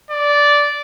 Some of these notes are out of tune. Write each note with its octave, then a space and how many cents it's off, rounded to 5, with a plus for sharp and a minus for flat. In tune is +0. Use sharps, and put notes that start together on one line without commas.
D5 -10